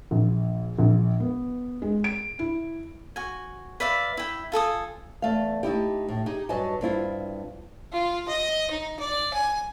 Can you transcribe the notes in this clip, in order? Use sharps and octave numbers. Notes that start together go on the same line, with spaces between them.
A#1
A#1
B3
G#3
D7
E4
F#4 G#5
B4 D5 E5 F5
E4 G5
F4 A4 G#5 D#6
E2 A3 F5
A3 D#4 E4 G4
A2
D#4 G4 G#4
G2 F#3 B4 D#5 G#5 A5
G2 C4 E4 F4
F4
D#5
D#4
D5
G#5